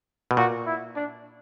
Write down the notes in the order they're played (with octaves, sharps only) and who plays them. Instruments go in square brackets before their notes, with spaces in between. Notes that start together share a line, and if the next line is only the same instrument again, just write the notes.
[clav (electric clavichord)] B2
[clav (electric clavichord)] A#2 [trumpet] F#4
[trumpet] E4
D4